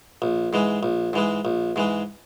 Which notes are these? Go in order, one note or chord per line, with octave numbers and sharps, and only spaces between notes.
A#1
G#2 E3 G#3
A#1
G#2 E3 G#3
A#1
G#2 E3 G#3